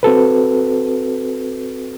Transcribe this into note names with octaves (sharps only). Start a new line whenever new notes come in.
C4 F#4 A4 B4